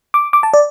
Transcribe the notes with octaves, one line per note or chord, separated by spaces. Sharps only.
D6
D6
A5
D5